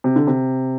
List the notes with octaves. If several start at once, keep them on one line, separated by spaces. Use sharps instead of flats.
C3
D3
C3